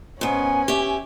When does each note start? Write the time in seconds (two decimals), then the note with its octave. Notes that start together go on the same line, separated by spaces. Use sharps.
0.21 G#2 B3 C#4 G#5
0.68 G4 E5